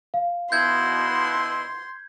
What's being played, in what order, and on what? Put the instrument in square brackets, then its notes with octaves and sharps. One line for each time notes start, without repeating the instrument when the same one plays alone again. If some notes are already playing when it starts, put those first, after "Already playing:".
[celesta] F5
[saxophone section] B2 E4 [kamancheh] C6 [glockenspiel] G6 G#6